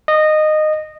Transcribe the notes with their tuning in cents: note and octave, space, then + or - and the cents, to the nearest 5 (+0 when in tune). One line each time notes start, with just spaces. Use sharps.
D#5 -15